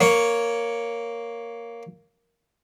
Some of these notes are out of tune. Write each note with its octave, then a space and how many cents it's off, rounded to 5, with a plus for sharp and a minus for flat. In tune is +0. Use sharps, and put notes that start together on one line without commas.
A#3 +0 C#5 +5